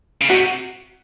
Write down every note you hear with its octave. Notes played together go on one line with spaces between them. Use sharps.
C#3
C3 F#4